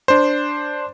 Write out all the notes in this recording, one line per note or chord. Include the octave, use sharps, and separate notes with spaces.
D4 C5